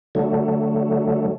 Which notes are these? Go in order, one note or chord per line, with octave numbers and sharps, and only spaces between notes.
D3 F#3 A3